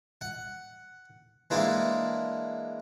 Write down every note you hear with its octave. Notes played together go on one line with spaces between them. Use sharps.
F#5
E3 G#3 A#3 D4 E4